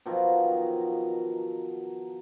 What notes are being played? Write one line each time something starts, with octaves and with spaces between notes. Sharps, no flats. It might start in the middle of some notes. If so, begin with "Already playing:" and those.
B2 D#3 F3 F#3